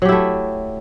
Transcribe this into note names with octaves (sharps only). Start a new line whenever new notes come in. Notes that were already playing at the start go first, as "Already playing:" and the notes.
F#3 A3 E4 G4